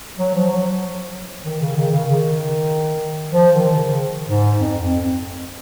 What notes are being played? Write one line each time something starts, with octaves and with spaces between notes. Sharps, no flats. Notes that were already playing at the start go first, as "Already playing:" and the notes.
F#3
F3
F#3
D#3
C#3
D#3
C#3
D#3
F3
D#3
C#3
G#2
F2
F2